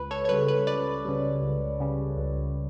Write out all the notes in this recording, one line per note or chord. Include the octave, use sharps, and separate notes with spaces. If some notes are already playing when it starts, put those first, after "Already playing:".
Already playing: C#2 B4
A4 C#5
C#5
C#3 G3 B4
B4
C#2 B4 D5
C#3 G3
C#2
C#3 G3
C#2